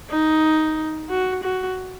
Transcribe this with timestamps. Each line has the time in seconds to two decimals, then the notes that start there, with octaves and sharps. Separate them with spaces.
0.10 D#4
1.09 F#4
1.43 F#4